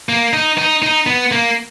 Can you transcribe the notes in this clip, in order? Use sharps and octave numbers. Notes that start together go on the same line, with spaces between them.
A#3
D#4
D#4
D#4
B3
A#3